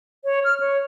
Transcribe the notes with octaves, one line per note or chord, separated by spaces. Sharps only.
C#5
F6
C#5